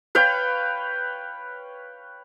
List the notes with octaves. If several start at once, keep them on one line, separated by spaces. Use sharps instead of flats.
B4 C#5 F5 G5